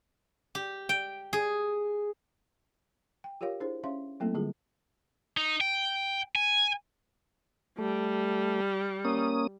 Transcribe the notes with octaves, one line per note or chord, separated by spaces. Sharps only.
G4
G5
G#4
G5
F4 G4 A#4 C#5 F5
D4 E4 G#4 C5
C#4 C#5 E5 F5 C6
F#3 A3 A#3 C4 E4 A4
D3 G3 F4 G#4
D#4
G5
G#5
G3 A3
A#3 C#4 D#6